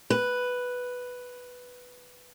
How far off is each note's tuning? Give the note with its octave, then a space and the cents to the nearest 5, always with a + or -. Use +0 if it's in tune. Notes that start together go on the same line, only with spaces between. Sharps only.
B4 +0